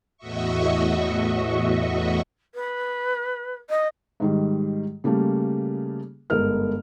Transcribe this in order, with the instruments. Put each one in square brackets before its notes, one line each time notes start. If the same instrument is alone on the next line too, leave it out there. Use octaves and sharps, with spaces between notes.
[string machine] E2 A2 F#4 D#5 E5 C#6
[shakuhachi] B4
D#5
[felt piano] G#2 D#3 G3
C#3 G3 A3 A#3
G1 G#2 A#4 F6